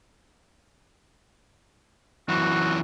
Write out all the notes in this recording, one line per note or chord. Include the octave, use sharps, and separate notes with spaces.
F#2 E3 F#4